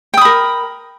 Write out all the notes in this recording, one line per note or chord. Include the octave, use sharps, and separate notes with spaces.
A#4 G5 B5 D#6